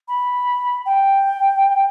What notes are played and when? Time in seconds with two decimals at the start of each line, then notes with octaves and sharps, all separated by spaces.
0.08 B5
0.86 G5